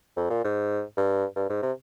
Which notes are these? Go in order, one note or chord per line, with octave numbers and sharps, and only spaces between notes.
F2
A#2
G#2
G2
G2
G#2
C3